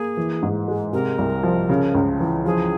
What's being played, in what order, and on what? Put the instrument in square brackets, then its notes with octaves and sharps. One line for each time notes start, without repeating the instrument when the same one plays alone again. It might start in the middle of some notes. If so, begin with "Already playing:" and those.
Already playing: [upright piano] A#3 [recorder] G#4
[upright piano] E3
G#2
G#3
[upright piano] C3 [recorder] A#4
[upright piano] C2
F3
C#3
C#2
E3
[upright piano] F3 [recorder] G#4